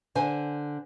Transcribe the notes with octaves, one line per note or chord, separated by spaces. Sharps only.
D3 C5 G#5